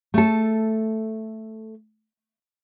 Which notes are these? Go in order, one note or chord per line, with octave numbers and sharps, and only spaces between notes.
A3 A4